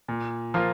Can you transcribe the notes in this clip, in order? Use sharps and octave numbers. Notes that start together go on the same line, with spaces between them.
A#2
F3 A#3 F4